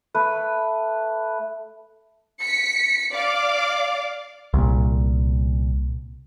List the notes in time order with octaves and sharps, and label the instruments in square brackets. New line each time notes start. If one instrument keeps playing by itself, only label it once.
[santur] A3 B4
[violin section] B6 C#7
D5 F5 D6
[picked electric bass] C2 A#2